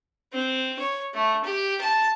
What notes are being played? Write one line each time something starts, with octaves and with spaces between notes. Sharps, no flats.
C4
C#5
A3
G4
A5